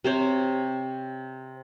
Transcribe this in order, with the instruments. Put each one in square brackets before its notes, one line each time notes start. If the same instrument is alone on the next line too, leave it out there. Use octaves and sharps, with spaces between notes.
[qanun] C3 C5 C#5